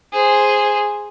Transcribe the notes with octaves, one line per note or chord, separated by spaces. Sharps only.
G#4 C5